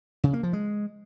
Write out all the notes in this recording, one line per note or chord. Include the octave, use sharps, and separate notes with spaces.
C#3
A#3
F3
G#3